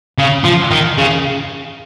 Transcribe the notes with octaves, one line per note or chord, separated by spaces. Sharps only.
C#3
F3
D#3
C#3